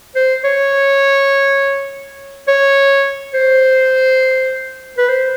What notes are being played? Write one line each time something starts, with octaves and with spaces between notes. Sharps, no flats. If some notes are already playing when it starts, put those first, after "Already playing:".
C5
C#5
C#5
C5
B4
C5